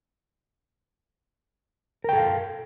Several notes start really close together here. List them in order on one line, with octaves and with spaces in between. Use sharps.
A#4 G5 A4 F5